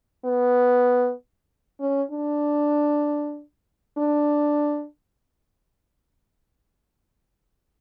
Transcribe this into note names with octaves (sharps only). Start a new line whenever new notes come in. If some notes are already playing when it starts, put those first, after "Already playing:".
B3
C#4
D4
D4